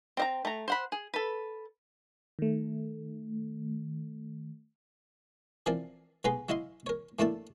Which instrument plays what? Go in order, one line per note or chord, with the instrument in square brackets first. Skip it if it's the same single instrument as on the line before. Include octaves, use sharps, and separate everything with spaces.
[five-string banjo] C4 D#5 A#5
A3 A#5
C5 F#5 B5
G#4
A4 B4
[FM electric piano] D#3 A3
[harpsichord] E3 F3 C4 A#4 D5
B1 B3 G#4 B4 A#5 C6
F#3 E4 D#5 F5 C6
A#4 C#5
A2 A3 A#3 D4 E4 A5